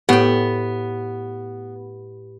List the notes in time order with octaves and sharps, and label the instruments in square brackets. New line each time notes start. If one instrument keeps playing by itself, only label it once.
[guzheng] A2 G5 [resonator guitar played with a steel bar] B3 [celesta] G4